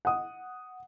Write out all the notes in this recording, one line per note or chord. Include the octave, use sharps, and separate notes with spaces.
F#5 D#6